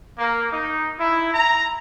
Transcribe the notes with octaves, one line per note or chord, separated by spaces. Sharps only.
A#3
D#4
E4
A#5